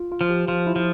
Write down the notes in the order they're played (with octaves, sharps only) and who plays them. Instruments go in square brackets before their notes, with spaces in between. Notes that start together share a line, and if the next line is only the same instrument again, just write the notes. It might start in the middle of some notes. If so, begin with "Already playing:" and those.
Already playing: [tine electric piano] F4
F4
[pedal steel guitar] F3
[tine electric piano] G4
[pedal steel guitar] F3 [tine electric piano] F4
[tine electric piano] E4
[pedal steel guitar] F3